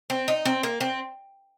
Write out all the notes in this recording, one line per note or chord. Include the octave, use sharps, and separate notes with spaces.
C4
D#4
C4
A#3
C4